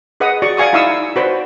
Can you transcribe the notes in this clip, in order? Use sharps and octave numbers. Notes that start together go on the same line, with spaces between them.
G#4 B4 D#5 F#5 D#6
F#4 D5 C#6
D5 F5 G#5 C#6 D#6
D#4 E4 F5 C#6 D#6 E6
F#4 B4 C5 D5